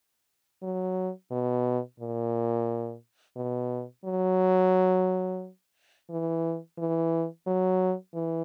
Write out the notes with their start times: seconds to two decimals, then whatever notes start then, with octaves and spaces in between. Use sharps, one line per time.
0.63 F#3
1.31 B2
2.00 A#2
3.36 B2
4.05 F#3
6.10 E3
6.78 E3
7.47 F#3
8.14 E3